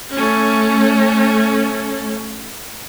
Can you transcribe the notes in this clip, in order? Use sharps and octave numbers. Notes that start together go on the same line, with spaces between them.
A3 C#4